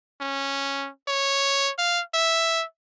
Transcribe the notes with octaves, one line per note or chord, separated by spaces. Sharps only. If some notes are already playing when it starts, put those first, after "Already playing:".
C#4
C#5
F5
E5